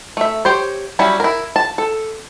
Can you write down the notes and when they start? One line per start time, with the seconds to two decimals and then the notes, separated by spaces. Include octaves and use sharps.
0.17 A3 E5
0.45 G4 C5 C#5
0.99 F#3 G3 C#4 E4
1.20 E4 A#4
1.56 A5
1.78 A4